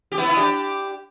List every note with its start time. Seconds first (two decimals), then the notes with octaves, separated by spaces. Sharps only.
0.12 G4
0.18 B3 E4
0.29 E4
0.37 D4 G4